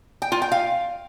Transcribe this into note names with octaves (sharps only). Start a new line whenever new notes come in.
G5
F4
G5
F5